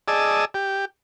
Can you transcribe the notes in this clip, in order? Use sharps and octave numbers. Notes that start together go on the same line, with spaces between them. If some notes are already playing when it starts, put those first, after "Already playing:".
G#4 D5 D#5 A5 E6
G4